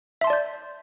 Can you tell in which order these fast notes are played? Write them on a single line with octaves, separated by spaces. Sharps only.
E5 C6 A5 D5 G6